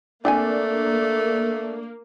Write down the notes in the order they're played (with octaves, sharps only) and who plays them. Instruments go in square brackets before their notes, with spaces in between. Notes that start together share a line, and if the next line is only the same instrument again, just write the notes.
[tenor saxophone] A3 [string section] A#3 [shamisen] C4 G5 G#5 [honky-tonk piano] D4